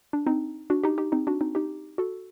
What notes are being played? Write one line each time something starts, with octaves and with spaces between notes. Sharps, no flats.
D4
C4 D#4
D4 F#4
D#4 G4
D#4 G4
C4 D#4
D4 F#4
C4 D#4
D#4 G4
F#4 A4